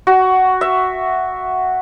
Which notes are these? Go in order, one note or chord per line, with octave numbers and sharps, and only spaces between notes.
F#4
E5